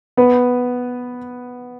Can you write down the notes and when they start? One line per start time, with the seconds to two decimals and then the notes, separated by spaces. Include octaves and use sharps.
0.17 B3 B4